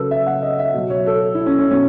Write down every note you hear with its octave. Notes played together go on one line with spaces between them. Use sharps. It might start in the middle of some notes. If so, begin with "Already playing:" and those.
Already playing: C#3 F#3 A4 B4
E5
F#5
D#5
E5
B2 F#3
C#5
A4
E4
C#4
C#4
B2 F#3 C#4